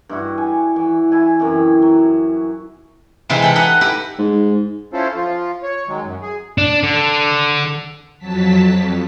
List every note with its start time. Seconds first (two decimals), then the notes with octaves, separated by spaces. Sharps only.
0.09 G2 E4 F#4
0.38 G#5
0.76 E3
1.12 E4 G#5
1.40 F#2 C3 E3
1.82 F#3
3.29 C3 E3 G#3 D#4 E4
3.42 A4 G5 B5
3.56 D#4 D#5 F#5
3.81 E4 G4 B4
4.19 G#2
4.93 C#4 E4 F4 A4 C5
5.15 F3 F4
5.63 C#5
5.88 D#3 F#3 G#3
6.03 F#2
6.22 G#4
6.58 D4
6.83 D3
8.19 F2 F#3 A5 B6
8.70 F2